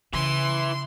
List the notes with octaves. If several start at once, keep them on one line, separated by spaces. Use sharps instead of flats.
C#3 E3 C6